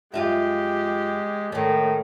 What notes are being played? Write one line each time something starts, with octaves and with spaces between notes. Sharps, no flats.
F#2 G#3 F4 G4 E5
A2 D#3 A3 C#4